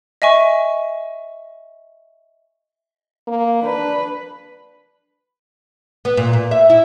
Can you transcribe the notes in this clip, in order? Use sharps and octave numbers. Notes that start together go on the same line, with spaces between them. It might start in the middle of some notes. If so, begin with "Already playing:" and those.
D#5 E5 G#5 C#6
A#3
D4 B4
B3
A#2
A#2
E5
E4